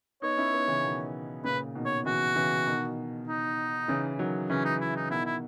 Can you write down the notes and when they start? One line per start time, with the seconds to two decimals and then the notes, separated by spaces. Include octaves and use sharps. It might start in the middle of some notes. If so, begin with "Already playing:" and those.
0.22 B3 D#4 C#5
0.38 C#4 E4
0.53 B3 D#4
0.68 C#3 E3
0.83 B2 D#3
1.44 A#2 C#3 B4
1.75 B2 D#3
1.85 C#5
2.05 C#3 E3 F#4
2.36 C#3 E3
2.66 B2 D#3
3.27 D#4
3.88 C#3 E3
4.19 D#3 F#3
4.49 C#3 E3 C#4
4.65 D#4
4.81 E4
4.96 D#4
5.11 B2 D#3 E4
5.25 E4